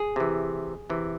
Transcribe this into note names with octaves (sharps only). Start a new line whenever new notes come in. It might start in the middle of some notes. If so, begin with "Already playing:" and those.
Already playing: G#4
C3 E3
C3 E3